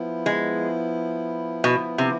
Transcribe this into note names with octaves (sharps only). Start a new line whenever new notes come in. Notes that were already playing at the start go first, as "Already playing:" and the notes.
Already playing: F3 B3 E4
G#3
B2
C3